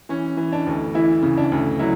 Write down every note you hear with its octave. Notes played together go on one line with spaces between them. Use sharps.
E3 C#4
E3
D4
D2
E3 E4
C#3
D4
D2
F#3 E4